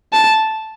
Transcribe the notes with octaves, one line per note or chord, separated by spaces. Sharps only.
A5